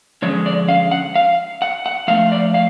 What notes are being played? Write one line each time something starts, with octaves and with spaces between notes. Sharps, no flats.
D3 F3 G#3 C#4 C#5
D5
F5
F#5
F5
F#5
F#5
F3 A3 D4 F5
D5
F5